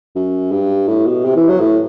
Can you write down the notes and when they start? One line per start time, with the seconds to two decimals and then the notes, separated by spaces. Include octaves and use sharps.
0.16 F#2
0.52 G2
0.88 A2
1.06 B2
1.25 C3
1.36 E3
1.49 F#3
1.60 A2